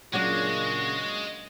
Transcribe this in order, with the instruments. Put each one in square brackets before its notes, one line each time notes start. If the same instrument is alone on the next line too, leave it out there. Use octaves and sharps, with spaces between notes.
[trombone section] A#2 C#3 [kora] F#3 A#3 D4 [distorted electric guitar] G#3 [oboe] F#4